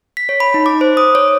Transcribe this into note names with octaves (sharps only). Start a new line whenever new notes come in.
B6
C#5
B5
D#4
D6
C5
D#6
C#5